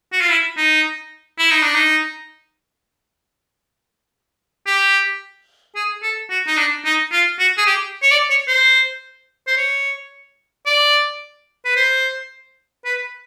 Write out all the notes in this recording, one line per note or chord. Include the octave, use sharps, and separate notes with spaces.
F#4
F4
E4
D#4
E4
D#4
D4
D#4
G4
G#4
A4
F#4
D#4
D4
D#4
F4
F#4
G#4
G4
C#5
D5
C#5
C5
C5
C#5
D5
B4
C5
B4